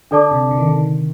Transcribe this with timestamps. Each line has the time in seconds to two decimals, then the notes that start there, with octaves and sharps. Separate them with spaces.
0.11 D3 D4 A4 D5 A5 D6
0.31 C3
0.51 D3
0.58 D#3
0.66 D3